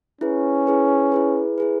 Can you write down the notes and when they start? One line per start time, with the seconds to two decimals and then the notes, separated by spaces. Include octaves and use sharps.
0.21 C#4 E4 G#4 B4
0.67 E4 G#4 B4
1.12 E4 G#4 B4
1.58 E4 G#4 B4